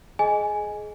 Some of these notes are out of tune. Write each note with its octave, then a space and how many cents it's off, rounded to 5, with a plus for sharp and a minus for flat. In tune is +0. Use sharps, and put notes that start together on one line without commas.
G#4 +20 D#5 -5 G#5 +0